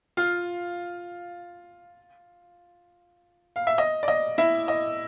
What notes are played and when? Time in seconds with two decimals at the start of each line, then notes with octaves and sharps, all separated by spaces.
0.17 F4 F5
3.56 F5
3.67 E5
3.78 D#5
4.03 D5
4.08 D#5
4.38 E4 E5
4.68 D#5